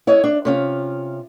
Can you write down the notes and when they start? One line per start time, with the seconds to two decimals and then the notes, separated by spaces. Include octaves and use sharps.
0.07 E4 C#5 D#5
0.24 D4
0.45 C3 C#4 F4